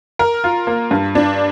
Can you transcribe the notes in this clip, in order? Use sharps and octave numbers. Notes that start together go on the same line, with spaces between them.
A#4
F4
A#3
G2
D4